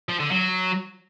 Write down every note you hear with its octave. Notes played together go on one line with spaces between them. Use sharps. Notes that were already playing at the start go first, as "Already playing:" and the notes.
F3
D3
F#3